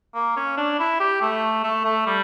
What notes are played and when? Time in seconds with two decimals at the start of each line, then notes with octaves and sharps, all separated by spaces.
0.14 A#3
0.37 C#4
0.57 D4
0.79 E4
1.00 G4
1.21 A3
1.64 A3
1.85 A3
2.06 G3